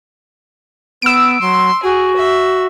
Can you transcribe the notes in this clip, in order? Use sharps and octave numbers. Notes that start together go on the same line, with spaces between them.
B3 E6 D7
F#3 C6
F#4 G#4
E5